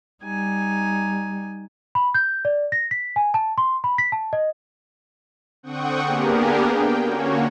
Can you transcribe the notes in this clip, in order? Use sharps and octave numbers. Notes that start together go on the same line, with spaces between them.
G3 D#4 G#5
B5
G6
D5
A#6
B6
G#5
A5
C6
B5
B6
A5
D#5
D3 C4 F#5 G5 C#6 D#6
A#3 B3 D4 G4 G#4 A#4
G5
D3 A#3 C#4 F#4 C#5